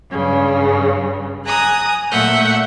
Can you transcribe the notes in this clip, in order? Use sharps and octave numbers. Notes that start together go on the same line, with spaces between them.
G2 C#3
G#5 A#5 D#6 F#6
A#2 A3 E5 F#5 G6